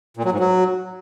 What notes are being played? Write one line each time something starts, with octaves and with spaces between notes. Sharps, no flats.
A#2
F#3
G#2
F#3